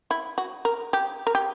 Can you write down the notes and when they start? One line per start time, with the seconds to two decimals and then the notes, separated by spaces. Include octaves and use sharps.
0.11 E4
0.38 F#4
0.65 A#4
0.93 G4
1.27 A#4
1.35 G4